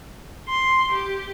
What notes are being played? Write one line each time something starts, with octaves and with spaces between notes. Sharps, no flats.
C6
G4